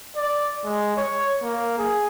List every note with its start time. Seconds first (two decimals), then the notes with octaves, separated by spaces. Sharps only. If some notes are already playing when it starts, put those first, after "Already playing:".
0.16 D5
0.65 G#3
0.97 C#5
1.42 A#3
1.78 G#4